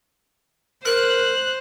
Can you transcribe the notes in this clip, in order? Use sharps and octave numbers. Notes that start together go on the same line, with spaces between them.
A#4 C5 F#6